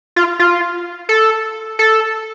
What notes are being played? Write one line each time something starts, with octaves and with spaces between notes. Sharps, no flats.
F4
F4
A4
A4